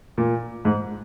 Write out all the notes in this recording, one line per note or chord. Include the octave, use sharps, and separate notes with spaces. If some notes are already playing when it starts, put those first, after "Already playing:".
A#2
G#2